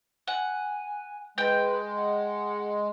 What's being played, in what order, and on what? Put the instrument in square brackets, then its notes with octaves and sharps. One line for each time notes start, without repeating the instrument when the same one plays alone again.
[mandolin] F#5 [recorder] G#5
[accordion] G#3 [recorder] B4 [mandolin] G5
[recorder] F#5